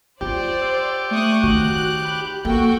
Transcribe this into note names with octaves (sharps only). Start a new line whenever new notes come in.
F4 G4 C5 D5
E6
A3 C#6 D#6 F#6
D#3 F#4 F#6
B5
A#3 F#4 A4 G5